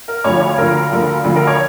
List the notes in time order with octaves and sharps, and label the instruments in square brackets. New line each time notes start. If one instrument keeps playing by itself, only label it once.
[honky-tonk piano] A#4
D2 D3 F3 C#5
C#5
D2 D3 F3 A#4
D2 D3 F3
D2 D3 F3
A#4
C#5